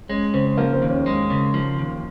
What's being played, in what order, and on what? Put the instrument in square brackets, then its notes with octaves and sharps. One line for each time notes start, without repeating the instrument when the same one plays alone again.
[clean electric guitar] G#3 [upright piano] C#4
[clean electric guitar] C#3 [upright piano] C4
[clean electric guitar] F3 [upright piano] A#3
[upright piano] C4
[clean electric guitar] D#2
[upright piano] C#4
[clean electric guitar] G#3
C#3
F3
D#2